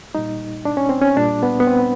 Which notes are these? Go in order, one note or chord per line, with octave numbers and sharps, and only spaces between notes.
A#2 G3 D#4
D4
C#4
C4
C#4
A#2 G3 D4
B3
B3
C4